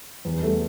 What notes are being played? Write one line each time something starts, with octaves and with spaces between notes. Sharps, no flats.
E2
G3 A3